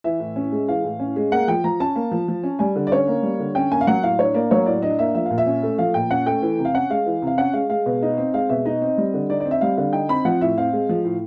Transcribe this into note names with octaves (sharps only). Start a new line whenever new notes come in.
E3 E5
A2
C#4
G#3
E3 F5
A2
C#4
G#3
A#3 F#5
F3 G5
F3 A#5
C#4 A5
A#3
F3
F3
C#4
G3 G#5
D3
D5
C#4 C#5
A#3
G3
D3
C#4 G5
A#3 G#5
F5
F#3 F#5
A2 F5
D4 C#5
A#3 D5
F#3 C#5
A2 D5
D4 D#5
A#3 E5
F3 E5
A#2 F5
E5
C#4
A3
F3 F5
A#2 G5
C#4 F#5
A3 G5
E3
C3
F5
C#4 F#5
G#3 F5
E3
C3 F5
C#4 F#5
G#3 F5
G#3 F5
B2
D#4
C4
G#3 F5
B2 E5
D#4 D#5
C4
G3
D3
D#4 D5
D5
C4
E5
G3 F5
D3 F5
D#4 G5
C4 B5
F3 F#5
A2 E5
C4 F5
G#3
F3
A2